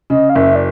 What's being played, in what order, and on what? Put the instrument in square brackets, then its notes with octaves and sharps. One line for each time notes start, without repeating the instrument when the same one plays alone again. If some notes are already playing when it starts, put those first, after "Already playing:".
[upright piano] C#3 [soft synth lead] D#5
[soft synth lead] F5
[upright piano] F#1 [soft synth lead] E5
[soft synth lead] D5